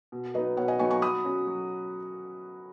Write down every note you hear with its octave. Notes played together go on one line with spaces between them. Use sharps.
B2
F#3 B3 D#4 B4 D#5
B2 C#5 F#5
D#5 G#5
F#3 B3 D#4 G#5 C#6
G#5 C#6
F#3 B5 D#6
C#4 F#4
F#3